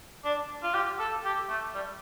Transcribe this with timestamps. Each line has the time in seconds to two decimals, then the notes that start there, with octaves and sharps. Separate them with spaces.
0.24 D4
0.63 F4
0.74 G4
0.99 A4
1.24 G4
1.49 A3
1.74 G3